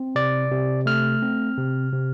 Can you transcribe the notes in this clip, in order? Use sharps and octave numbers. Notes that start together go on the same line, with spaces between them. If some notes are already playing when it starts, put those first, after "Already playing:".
Already playing: C4
C3 D5
C3
A3 F6
C4
C3
C3